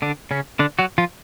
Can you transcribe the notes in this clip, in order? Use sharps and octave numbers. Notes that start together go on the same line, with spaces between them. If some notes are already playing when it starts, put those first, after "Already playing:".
D3 D4
C#3 C#4
D3 D4
F#3 F#4
F3 F4